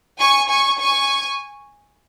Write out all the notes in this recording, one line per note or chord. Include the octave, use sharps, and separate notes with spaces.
G#5 C#6
G#5 C#6
G#5 C#6